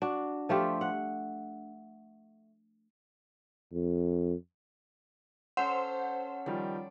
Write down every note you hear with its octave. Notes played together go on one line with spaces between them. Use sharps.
D4 F#4
F3 A3 F4 G4
F#5
F2
C#4 A4 C5 F#5 C6
D#3 F3 G3 D5